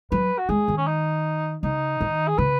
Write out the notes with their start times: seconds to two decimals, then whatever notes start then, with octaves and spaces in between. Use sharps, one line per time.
0.12 F#3 B4
0.38 F#4
0.49 G#3 G#4
0.68 D#3
0.78 C#4
0.87 D#4
1.63 C#3 D#4
2.01 D#3
2.28 G#4
2.38 C#3 B4